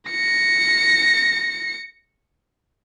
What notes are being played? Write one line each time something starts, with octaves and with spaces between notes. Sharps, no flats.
A#6 C#7